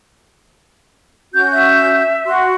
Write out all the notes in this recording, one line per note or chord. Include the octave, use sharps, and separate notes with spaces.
C#4 F#4 G6
E5
F#4 C6